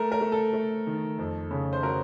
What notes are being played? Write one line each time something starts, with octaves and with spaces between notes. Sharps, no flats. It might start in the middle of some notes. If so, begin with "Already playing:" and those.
Already playing: A3 A#4
A#4
A3
A4
A3
D#3
F2
C#3
C5
F#3 A#4